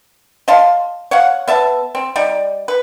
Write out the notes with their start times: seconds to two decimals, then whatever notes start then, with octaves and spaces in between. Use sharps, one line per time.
0.48 D#5 F5 A5 C6
1.11 C#5 F5 F#5
1.48 B3 E5 A5
1.95 C4
2.16 G3 D#4 D5
2.68 B4